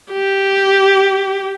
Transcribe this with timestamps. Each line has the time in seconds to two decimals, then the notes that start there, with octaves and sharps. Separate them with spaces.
0.12 G4